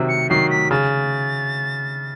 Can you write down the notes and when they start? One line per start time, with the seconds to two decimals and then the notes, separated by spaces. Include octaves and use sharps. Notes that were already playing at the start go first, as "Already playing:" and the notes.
Already playing: C3 D#3 F#3
0.09 C#7
0.30 D#3 F#3 C7
0.50 B6
0.71 C#3 A6